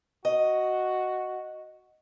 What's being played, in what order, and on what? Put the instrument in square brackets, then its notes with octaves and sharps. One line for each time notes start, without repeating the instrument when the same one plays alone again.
[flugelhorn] F#4 [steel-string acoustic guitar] D#5